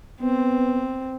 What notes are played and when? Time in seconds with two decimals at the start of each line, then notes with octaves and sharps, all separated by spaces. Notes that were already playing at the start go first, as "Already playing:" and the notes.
0.21 B3 C4